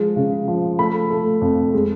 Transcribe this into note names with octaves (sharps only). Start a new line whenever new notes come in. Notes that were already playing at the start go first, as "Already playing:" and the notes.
Already playing: F3 G#3
C#3
F3
A3 B5
A3
F2
G#3